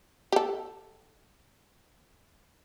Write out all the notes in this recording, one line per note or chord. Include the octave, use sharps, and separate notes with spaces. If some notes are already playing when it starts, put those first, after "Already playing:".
G4 A4